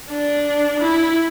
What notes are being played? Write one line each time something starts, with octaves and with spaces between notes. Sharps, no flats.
D4
E4